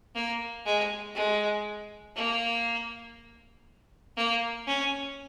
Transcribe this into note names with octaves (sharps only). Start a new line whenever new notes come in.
A#3
G#3
G#3
A#3
A#3
C#4